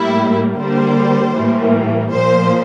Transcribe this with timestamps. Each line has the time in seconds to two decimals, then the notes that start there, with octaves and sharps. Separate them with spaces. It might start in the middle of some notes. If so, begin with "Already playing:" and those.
Already playing: A2 G3 A#3 E4
0.57 D3 G3 A#3 C5
1.34 A2 E3 G3 A#3
2.10 A#2 F3 A#3 C5